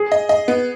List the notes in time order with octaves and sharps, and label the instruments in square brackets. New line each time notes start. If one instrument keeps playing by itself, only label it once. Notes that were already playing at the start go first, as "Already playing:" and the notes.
Already playing: [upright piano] G#4
[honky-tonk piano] D#5
D#5
B3